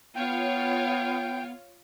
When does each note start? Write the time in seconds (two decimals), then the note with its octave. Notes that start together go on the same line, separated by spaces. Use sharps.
0.16 B3 F4 C#5 F5 G5